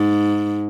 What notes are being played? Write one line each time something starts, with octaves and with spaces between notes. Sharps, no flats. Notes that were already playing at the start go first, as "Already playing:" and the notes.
Already playing: G#2